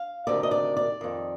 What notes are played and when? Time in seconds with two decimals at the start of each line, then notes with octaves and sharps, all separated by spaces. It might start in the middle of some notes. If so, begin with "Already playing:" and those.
Already playing: F5
0.27 D2 C3 D#3 D5
0.43 D#5
0.51 D5
0.77 D5
1.01 F2 D#3